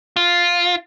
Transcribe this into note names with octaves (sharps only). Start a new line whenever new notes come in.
F4